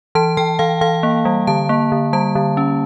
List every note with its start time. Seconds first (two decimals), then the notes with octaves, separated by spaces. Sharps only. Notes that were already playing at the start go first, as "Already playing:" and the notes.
0.15 E3 A5
0.37 E3 G5
0.59 E3 F5
0.81 E3 F5
1.03 A#3
1.25 G3
1.47 D3 A5
1.69 A#3
1.92 D3
2.13 G3 A5
2.35 D3
2.57 C#4